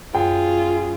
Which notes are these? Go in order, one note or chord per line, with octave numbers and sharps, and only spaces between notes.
F#2 F4 G#4 G5